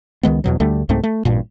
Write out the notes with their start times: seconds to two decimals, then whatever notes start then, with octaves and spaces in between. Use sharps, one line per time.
0.23 C#2 D#3 G#3 B3
0.44 E2 B2 F#3
0.60 D2 D3 G3 A3
0.89 C2 G#2 A3 C4
1.03 A3
1.25 A1 G2 A#2